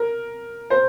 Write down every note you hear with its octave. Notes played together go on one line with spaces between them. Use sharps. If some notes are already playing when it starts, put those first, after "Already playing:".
Already playing: A#4
C5